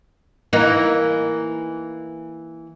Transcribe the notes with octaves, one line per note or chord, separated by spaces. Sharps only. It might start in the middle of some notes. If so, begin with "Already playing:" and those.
E3 A#3 D#4